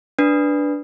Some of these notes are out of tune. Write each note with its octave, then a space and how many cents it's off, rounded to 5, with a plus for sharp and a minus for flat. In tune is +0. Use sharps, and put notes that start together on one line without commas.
D4 +0 B4 +0